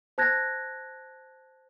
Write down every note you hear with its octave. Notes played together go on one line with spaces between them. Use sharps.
C5 A5 F#6 G#6 A#6